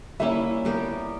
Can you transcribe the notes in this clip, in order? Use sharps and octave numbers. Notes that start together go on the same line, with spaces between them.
G3 A#3 C#4 E4 E5
G3 B3 G4 A#4